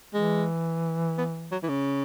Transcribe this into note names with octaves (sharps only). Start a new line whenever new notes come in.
E3 G#3
B3
F#3
E3
C#3